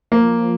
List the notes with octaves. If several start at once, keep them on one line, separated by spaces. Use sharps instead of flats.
F3 A#3